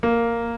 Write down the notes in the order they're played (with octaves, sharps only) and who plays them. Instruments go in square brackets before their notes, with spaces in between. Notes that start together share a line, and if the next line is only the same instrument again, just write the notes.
[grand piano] A#3